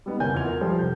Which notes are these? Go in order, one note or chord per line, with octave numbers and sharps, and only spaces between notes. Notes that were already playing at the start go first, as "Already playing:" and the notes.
G3 B3 D#4
F#1 C#4 A#4 G#5 G6
E2 B2 F4 B4 G#6 F7
A#4
F3 G3 F4 A4 C5
F1 G6